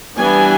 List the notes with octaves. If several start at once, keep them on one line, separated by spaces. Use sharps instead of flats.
E3 G3 B3 D4 G#5